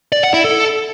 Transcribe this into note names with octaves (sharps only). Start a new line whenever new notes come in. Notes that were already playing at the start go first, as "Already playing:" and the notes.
D5
F#5
E4
A4